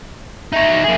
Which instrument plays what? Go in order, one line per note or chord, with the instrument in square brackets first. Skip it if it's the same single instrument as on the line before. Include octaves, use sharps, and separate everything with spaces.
[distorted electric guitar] D#4 C#5 [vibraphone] E5
[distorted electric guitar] A#3 G#4